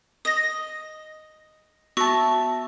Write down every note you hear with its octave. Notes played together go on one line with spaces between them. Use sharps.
D#5 D#6 A#6
B3 F#4 E5 A5 C#6 A#6